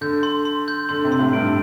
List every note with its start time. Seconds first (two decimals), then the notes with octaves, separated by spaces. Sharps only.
0.01 D3 G6
0.23 C6
0.45 C6
0.68 G6
0.89 D3 C6
1.04 C3
1.12 C6
1.19 A2
1.33 G2 D7